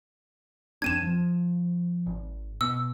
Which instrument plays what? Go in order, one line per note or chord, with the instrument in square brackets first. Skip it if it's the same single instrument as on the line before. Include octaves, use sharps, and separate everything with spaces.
[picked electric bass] F2 C4 D4 [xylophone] G#6 D#7 E7
[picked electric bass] F3
G#1
[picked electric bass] B2 [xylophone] E6